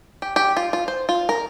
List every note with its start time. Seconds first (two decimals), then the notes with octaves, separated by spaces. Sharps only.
0.22 G4
0.36 G4
0.57 F4
0.73 F4
0.88 C5
1.09 F4
1.29 A#4